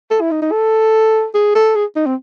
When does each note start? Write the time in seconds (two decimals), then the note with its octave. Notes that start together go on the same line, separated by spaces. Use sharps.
0.11 A4
0.21 E4
0.31 D#4
0.42 D#4
0.52 A4
1.34 G#4
1.55 A4
1.76 G#4
1.96 D#4
2.06 C4